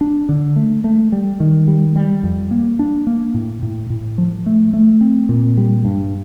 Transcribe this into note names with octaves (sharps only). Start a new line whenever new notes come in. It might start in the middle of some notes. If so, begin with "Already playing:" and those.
D4
D3
A3
A3
G3
D#3
G3
G3
F2
A#3
D4
A#3
A2
A2
A2
F3
A3
A3
C4
A#2
G3
G2